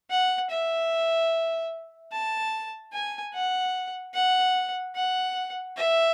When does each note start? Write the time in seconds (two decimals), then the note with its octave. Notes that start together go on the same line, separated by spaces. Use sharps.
0.10 F#5
0.50 E5
2.12 A5
2.93 G#5
3.33 F#5
4.14 F#5
4.95 F#5
5.76 E5